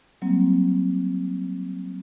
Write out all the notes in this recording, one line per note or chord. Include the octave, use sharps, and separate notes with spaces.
F#3 G3 A#3 C4